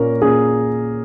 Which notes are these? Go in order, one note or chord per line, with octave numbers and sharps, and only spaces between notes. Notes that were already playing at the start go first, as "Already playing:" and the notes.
Already playing: A#2 A#3 C#4 A#4
A#2 A#3 C#4 G#4